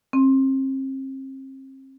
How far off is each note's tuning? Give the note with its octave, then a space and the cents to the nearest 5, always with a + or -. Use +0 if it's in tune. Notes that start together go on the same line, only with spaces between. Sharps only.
C4 +35